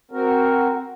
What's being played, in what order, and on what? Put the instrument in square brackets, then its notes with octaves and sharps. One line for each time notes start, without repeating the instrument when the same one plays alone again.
[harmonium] C4 F#4 A#4